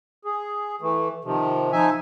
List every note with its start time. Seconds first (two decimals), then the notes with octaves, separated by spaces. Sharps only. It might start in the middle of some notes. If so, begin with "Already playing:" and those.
0.25 G#4
0.81 E3 A3
1.24 C3 D#3 F3
1.72 F3 D#4 E5 G#5